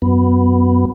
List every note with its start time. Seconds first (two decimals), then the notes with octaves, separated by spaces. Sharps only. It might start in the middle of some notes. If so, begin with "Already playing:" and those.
0.02 F#2 B3